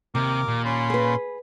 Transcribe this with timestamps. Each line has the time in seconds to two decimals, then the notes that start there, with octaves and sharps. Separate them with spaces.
0.15 D#2 C3 A#4 D6
0.48 A#2
0.65 C#4 B5 C6
0.90 G#4 B4